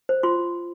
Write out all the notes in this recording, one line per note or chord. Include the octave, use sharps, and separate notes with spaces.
C5
F4 C6